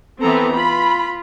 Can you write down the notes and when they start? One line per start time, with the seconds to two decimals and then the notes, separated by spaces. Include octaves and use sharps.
0.21 E3 B3 C4 A4 A#5
0.54 F4 B5